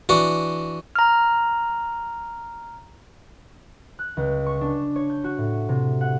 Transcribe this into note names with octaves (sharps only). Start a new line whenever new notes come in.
E3 D4 F#4
A#5 F6
F#6
C#2
C#6
D4
C#5
G6
F#4
A2
C3
F#5